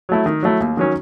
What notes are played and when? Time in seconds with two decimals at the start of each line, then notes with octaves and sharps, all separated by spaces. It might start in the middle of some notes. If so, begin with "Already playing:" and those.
0.09 F#3 A3 E4
0.26 D#3
0.43 F#3 A3 E4
0.60 D#2
0.77 D#3 F#3 C#4